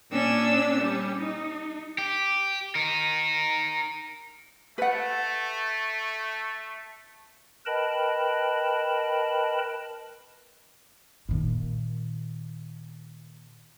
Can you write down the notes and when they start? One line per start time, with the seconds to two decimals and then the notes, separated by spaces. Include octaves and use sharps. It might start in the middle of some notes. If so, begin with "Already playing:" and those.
0.11 A#2 C#4 D4 D5 E6
0.79 G3 C#4
1.18 D#4
1.98 G4
2.75 D#4 A#4
4.78 A3 B4 F#5
7.66 A#4 B4 D#5 G5 A5 B5
11.29 A#2 D#3